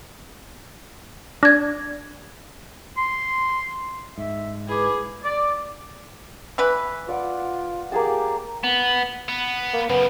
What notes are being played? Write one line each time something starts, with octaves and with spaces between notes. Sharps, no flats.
D4 G#6 A#6
C6
G#2 E5
E4 G#4 B4 D6
D5
E3 B4
F4 D5 F#5
A#3 G4 G#4 A5
B3
B3
A#3
F#2 C#3 B3